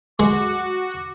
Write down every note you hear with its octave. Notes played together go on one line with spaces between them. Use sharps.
G#3 F#4 D6